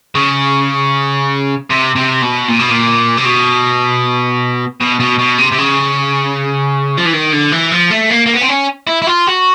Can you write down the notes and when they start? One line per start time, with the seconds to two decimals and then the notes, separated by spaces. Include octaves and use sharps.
0.15 C#3
1.70 C3
1.96 C3
2.22 B2
2.48 A#2
2.59 B2
2.70 A#2
3.18 C3
3.25 B2
4.80 B2
5.00 B2
5.19 B2
5.39 C3
5.52 C3
5.59 C#3
6.98 F3
7.05 E3
7.13 D#3
7.33 D3
7.52 E3
7.71 F3
7.91 A3
8.10 A#3
8.27 A#3
8.34 B3
8.42 C4
8.49 C#4
8.87 E4
9.02 E4
9.07 F4
9.27 F#4